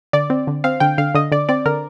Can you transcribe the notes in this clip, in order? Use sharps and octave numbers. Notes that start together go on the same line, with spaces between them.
D3 D5
C4
D3
C4 F5
D3 G5
D3 F5
D3 D#5
D3 D5
C4 D5
D3 A#4